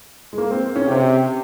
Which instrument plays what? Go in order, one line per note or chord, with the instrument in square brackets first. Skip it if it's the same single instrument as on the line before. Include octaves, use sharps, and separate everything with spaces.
[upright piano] G#3
A#3
C4
C#4
[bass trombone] C3 [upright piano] G4